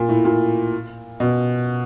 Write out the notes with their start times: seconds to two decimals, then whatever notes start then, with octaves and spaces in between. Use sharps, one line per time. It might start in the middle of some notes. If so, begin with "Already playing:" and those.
Already playing: A#2
0.09 A2
0.25 A#2
1.20 B2